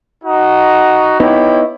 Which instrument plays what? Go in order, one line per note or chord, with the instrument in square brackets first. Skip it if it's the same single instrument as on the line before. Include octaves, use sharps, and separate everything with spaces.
[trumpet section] D#4 F#4
[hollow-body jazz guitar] B3 D#4 [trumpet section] E4 G4 C#5